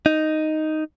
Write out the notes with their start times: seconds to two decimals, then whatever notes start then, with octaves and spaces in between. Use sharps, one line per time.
0.06 D#4